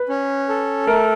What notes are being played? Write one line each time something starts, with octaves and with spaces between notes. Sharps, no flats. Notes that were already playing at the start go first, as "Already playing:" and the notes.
Already playing: B4
C#4
A4
A3 A#4